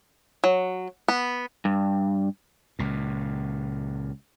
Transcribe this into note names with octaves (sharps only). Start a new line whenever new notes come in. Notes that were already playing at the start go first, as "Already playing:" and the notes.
F#3
B3
G2
C#2 A#2